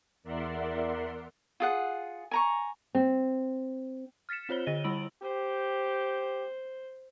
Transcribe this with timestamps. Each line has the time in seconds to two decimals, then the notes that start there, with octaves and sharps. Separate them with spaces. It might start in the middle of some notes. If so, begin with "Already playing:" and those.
0.23 E2 A#4 D5 E5 F#5 C6
1.60 F4 G#4 F#5
2.31 G#5 A#5 C#6
2.95 C4
4.29 F6 A6 B6 C#7 E7
4.49 C4 F4 C5 C#5 G7
4.67 D3 D#5 A#6 D#7 G7
4.84 G3 E4 B5 E6 D7 F#7
5.22 G4 C5